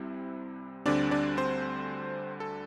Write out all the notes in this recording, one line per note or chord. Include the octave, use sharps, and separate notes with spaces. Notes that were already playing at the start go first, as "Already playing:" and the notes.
Already playing: C2 C3 G3 C4 E4
D2 D3 G3 C4 D4 D5
D4 D5
C4 C5
A4